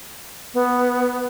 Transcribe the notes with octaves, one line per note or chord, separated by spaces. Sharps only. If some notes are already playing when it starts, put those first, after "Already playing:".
B3